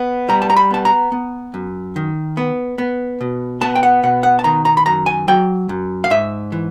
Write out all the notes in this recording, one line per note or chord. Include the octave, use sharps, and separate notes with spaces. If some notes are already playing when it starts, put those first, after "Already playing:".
Already playing: B3
G3 A#5
A5
A#5
B5
B3 A5
A#5
B3
F#2
D#3
B3
B3
B2
B3 A5
G5
F#5
B2 F#5
F#5
A5
D#3 A#5
A#5
B5
F#2 A#5
G#5
F#3 G5
F#2
F5
G#2 E5
E3